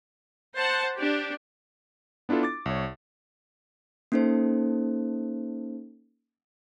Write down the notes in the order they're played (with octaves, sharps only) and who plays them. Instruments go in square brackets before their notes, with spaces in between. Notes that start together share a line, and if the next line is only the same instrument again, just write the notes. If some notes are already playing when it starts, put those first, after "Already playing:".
[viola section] C5 F#5 A5
D4 G4
[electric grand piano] B3 D4 E4 F4 A4
D6 A6
C2 C#5
[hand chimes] A#3 C#4 D#4 A4 C5